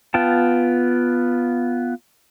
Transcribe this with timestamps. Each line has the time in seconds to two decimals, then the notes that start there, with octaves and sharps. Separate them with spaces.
0.14 B3 F4 G5 A5